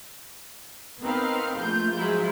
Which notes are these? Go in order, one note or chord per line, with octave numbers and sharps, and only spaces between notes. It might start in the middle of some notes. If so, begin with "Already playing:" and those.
B3 C4 D#4 A#4 B4 F5
A#1 A3 F4 G6
G#2 F3 F#3 E4 F4